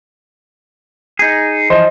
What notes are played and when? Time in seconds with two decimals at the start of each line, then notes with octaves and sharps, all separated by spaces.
1.19 D#4 G#4
1.70 E3 F3 C5 D#5 C6